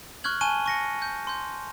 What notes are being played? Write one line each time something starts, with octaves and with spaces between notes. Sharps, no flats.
C#6 F6 F#6 G#6 F#7
G#5 A5 C#6 F#6 D#7 G7
C#6 A#6 C#7
G6
C6 G6